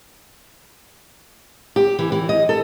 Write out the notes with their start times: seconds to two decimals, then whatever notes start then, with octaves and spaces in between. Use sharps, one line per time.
1.76 G4
1.99 E3
2.12 E3
2.29 D#5
2.49 A4